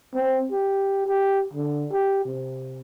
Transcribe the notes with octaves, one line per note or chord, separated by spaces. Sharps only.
C4
G4
G4
D3
G4
C3